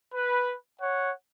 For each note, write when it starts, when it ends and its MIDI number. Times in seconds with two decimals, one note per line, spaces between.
0.14 0.55 71
0.81 1.13 73
0.81 1.13 78